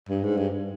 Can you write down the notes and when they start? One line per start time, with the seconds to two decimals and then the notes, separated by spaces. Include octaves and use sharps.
0.10 G2
0.24 G#2
0.37 G2